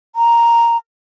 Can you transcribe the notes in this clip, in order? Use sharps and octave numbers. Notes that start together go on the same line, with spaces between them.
A#5